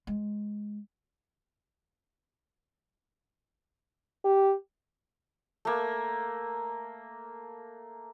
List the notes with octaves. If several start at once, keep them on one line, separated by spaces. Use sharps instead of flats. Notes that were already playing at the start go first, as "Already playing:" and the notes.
G#3
G4
A3 A#3